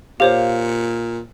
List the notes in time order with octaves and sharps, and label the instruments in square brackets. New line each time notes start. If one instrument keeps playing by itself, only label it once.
[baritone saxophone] A#2 [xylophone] G4 C5 C#5 [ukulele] F5